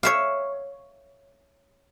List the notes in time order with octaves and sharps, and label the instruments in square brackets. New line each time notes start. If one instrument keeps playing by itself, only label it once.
[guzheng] C#5 E5 F5